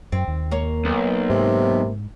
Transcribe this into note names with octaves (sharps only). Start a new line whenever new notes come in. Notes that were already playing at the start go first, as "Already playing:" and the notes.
F#2 C4
D#2
A#3 C#5
B1
G#2 C3